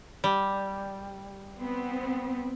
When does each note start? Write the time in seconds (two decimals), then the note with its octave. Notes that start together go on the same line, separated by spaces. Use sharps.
0.24 G3
1.59 B3 C4